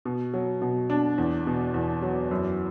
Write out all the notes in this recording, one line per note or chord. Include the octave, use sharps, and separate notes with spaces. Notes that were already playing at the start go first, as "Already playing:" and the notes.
B2
F#3
B2
D4
E2
B2
E2
F#3
F#2